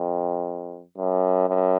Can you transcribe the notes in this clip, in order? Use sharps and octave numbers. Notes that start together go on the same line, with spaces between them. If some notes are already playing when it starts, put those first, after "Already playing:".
Already playing: F2
F#2
F#2